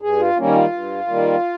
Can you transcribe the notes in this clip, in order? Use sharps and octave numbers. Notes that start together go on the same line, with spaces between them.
G2 G#4
F4
D#3 G3 A#3 C#4
F4
G2
D#3 G3 A#3